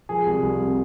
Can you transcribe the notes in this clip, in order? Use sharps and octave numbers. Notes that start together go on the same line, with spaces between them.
F3 G#4
C2
C2
C3